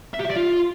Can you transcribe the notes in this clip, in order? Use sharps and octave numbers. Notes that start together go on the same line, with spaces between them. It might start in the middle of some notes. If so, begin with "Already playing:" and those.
E5
G4
E5
D5
F4